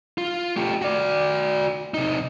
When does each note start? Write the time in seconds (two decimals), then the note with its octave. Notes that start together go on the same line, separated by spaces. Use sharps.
0.18 F4
0.56 A3 G4
0.82 F#4 D5
1.94 C3 D#4